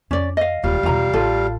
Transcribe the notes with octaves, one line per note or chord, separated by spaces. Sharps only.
F2 C#4 D5
D#5 F5
D#1 G3 G#3 F4 F5
E2 B2 F4 A#5
A1 F4 A4